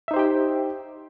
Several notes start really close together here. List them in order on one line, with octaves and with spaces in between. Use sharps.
E5 D#4 C5 G4 G5